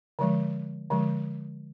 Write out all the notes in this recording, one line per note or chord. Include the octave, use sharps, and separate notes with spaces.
D3 F3 G#3
D3 F3 G#3